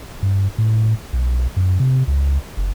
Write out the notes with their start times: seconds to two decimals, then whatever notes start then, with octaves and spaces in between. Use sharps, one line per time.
0.23 G2
0.58 A2
1.13 B1
1.57 F#2
1.80 C3
2.08 C#2
2.57 F#1